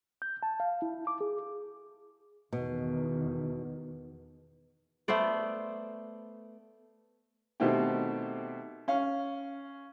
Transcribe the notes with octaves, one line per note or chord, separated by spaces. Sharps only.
G6
A5
F5
E4
D6
G#4
E2 B2 D#3
A3 B3 C5 D5
B2 D#3 A3 C4 E4 G4
C#4 F5